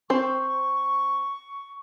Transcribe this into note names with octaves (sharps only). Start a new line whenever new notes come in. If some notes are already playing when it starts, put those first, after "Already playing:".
C4 C5 C#6